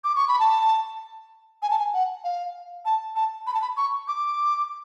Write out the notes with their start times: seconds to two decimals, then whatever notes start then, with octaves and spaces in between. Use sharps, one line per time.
0.04 D6
0.16 C#6
0.28 B5
0.39 A5
1.62 G#5
1.70 A5
1.79 G#5
1.93 F#5
2.24 F5
2.85 A5
3.16 A5
3.47 B5
3.54 A5
3.62 B5
3.77 C#6
4.08 D6